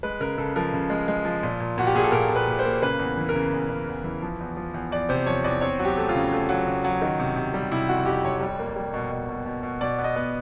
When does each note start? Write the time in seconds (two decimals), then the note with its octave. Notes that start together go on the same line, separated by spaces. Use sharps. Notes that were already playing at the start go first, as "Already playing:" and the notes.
0.03 G#3 B4
0.20 C#3 A#4
0.37 C#3 A4
0.56 F3 A#4
0.73 C#3
0.90 G#3
1.08 G#3
1.25 F3
1.43 A#2
1.60 A#2
1.78 A#2 F#4
1.87 G4
1.95 A#2 G#4
2.04 A4
2.12 A#2 A#4
2.30 A#2
2.36 B4
2.47 A#2
2.59 C5
2.65 A#3
2.83 C#3 B4
2.99 E2
3.17 E3
3.29 A#4
3.35 C#3
3.52 E2
3.69 C#3
3.88 E2
4.04 E3
4.22 F3
4.40 E2
4.57 F3
4.74 E2
4.91 E2 D5
5.09 C3 C5
5.26 F3 C#5
5.44 E2 D5
5.61 C4 C#5
5.79 F#3
5.85 G4
5.97 A3
6.09 F4
6.15 C#3
6.32 A3
6.49 F#3
6.66 C#3
6.84 F#3
7.02 D#3
7.19 C3
7.36 C3
7.54 G3
7.72 C3 E4
7.89 F2 F#4
8.06 F2 G4
8.24 F2 C#5
8.41 G3
8.59 A#3
8.76 G3
8.93 B2
9.11 B2
9.29 B2
9.45 B2
9.63 B2
9.81 B2 D5
9.99 B3
10.04 D#5
10.16 B3